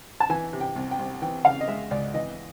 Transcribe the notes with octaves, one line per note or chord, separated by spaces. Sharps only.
A5
E3 G#5
C3
G5
C2
G5
C2
E3 G5
C#3 F5
D#5
G#3 E5
C#2 D5
E3 D#5